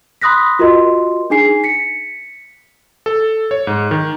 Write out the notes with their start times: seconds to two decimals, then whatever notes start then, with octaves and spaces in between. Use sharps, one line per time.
0.22 B5 C6 D#6 F#6 A#6 B6
0.59 F4 F#4 A#4 D#5 C6
1.30 D4 D#4 G#4 G#5 C7
1.64 B6 C#7
3.06 A4
3.51 C#5
3.67 G#2
3.91 D#3